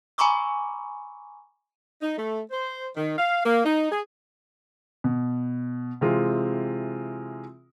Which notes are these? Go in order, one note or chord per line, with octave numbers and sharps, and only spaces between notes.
G#5 A#5 B5 C#6 D6 E6
D#4
A3
C5
D#3
F5
A#3
D#4
G#4
B2
C3 E3 G#3 C4 F4